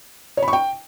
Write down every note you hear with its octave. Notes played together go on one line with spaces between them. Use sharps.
C#5
B5
C#6
G5